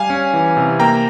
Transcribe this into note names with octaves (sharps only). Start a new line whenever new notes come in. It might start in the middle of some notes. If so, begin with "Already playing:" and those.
Already playing: G3 F5 G#5
C#4
E3
C3
A#3 G5 A#5